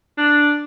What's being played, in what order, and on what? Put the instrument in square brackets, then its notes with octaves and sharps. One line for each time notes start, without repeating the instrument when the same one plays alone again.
[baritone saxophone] D4